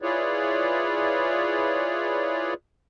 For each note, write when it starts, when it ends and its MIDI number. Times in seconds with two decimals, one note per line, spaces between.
0.02 2.54 64
0.02 2.54 65
0.02 2.54 68
0.02 2.54 71
0.02 2.54 73
0.02 2.54 74